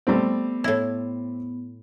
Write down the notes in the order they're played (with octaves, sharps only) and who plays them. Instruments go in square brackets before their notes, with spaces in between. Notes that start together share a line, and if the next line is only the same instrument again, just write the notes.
[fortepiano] G3 A3 C4 [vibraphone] B3
[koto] A2 E4